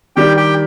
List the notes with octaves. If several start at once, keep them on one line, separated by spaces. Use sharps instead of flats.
D#3 G3 D4 G4 G5
G4 G5